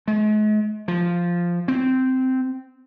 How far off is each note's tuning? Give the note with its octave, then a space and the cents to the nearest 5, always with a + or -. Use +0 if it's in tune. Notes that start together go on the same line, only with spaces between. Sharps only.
G#3 +40
F3 -5
C4 -10